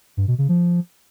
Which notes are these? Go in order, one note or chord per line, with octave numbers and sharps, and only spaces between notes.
G2
B2
C#3
F3